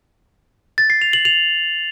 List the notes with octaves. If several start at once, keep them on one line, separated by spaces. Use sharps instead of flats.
A6
C7
F7
F#7
F7